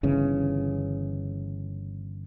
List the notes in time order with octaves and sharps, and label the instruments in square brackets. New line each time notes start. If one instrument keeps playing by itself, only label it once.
[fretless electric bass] G1 C#3 E3 C#4